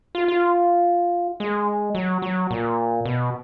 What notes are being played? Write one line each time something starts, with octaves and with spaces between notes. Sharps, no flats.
F4
F4
G#3
F#3
F#3
A#2
B2